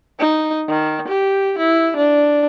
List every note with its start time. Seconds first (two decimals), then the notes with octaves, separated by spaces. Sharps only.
0.19 D#4
0.68 D#3
1.08 G4
1.58 E4
1.96 D4